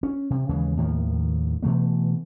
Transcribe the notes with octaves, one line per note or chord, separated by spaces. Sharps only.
C#4
C3
D#2 C#3 E3 G#3
D#2 A2 D#3 F3
B2 E3 A3 B3